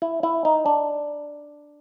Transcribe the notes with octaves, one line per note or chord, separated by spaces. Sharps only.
E4
E4
D#4
D4